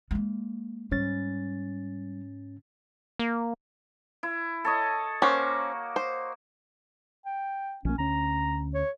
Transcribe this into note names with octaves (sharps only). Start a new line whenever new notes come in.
G#3 A#3
G#2 G3 C#4 A6
A#3
E4
A4 C#5 D#5
A#3 C#4 F#4 C5
C5
G5
A#1 A#3 C#4
D2 C#4 A#5
C#5